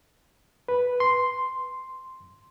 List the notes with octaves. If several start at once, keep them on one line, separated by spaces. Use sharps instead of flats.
B4
C6